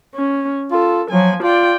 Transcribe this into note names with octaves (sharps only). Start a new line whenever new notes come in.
C#4
F4 A4
F3 F#3 G#5
F4 D5 G5